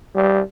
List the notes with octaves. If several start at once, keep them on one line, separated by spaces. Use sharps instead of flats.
G3